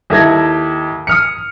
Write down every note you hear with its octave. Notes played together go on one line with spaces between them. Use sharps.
D#2 E4 A4 G#6 A#6
D#6 F6 C#7